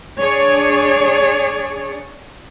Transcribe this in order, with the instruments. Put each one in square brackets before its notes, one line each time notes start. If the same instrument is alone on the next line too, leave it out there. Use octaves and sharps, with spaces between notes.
[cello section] D4 G#4 C#5 D5